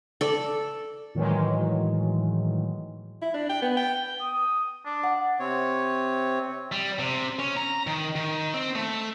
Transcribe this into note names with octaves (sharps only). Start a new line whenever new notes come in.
A4 D5
A2 D#3 E3 F#3 G#3
E4
D4
G5
B3
G5
D#6
D4
F#5
C3 C4 C#5
G3
C3
C#4
A#5
D#3
D#3
C4
A3